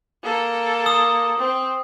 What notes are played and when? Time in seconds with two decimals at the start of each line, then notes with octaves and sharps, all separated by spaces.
0.23 A#3 A4
0.86 D#6
1.38 C4